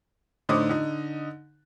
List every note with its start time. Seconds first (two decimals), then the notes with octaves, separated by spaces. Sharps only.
0.49 A2 D3 D#4 C5 D6 D#6
0.69 D3 D#4